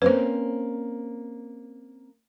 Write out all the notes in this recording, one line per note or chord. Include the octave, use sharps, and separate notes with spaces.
A#3 C4 C#4 B4 C5